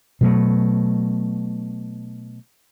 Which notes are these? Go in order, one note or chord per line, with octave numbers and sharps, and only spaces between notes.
B2 F#3 A3